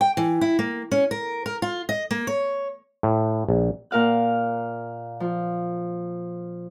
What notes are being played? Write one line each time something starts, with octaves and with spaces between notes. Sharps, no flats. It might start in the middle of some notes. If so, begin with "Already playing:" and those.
G5
E3
E4
A#3
C#4
A#4
A#4
F4
D#5
A#3
C#5
A2
A#1
A#2 A#4 F5 F#6
F3